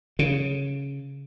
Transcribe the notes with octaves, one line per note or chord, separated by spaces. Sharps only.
C#3